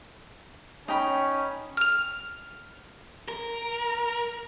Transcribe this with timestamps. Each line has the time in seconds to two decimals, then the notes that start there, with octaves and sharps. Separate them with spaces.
0.88 C#4 D#4 G5 B5
1.77 F6 F7
3.29 A#4